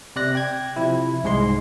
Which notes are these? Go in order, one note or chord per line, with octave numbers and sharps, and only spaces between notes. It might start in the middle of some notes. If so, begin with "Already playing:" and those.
C3 D5 F#6 A#6
G5 G#6
C3 F3 E4
C2 G#2 G#3 C6